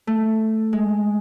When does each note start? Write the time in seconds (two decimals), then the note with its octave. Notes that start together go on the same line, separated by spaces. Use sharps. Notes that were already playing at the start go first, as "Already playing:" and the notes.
0.07 A3
0.73 G#3